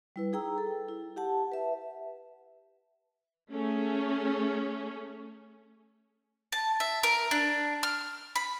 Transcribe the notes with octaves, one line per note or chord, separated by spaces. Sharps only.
G3 E4 B4
D#4 G#4 G5 A#5 E6
A4
E4
G4 F#5 A5
B4 E5
A3 C#4 G#4
A5
E5
A#4
D4
F6
B5